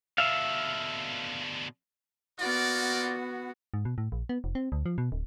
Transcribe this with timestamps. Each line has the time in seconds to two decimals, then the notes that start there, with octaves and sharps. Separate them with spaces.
0.18 B2 D3 E5 F5
2.39 A#3 B3 F4 F#4 D5
3.74 G#2
3.85 B2
3.98 A2
4.12 A#1
4.29 B3
4.44 F1
4.55 C4
4.72 D2
4.86 F3
4.98 B2
5.12 D1